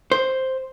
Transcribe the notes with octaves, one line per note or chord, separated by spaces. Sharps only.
C5